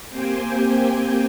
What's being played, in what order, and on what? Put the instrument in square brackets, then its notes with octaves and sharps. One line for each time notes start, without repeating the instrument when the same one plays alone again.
[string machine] A#3 C4 G4 C5 G5 G#5